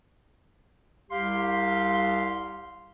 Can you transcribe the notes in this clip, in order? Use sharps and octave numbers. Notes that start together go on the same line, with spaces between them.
C2 G4 F5 C6